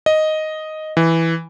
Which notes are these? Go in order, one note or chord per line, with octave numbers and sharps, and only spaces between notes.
D#5
E3